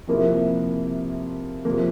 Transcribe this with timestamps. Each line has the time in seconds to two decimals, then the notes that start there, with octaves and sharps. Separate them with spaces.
0.07 C3 F3 A#3 E4 A#4
1.65 C3 F3 A#3